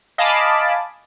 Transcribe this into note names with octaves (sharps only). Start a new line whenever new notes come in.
D#5 F5 G#5 A5 B5 D6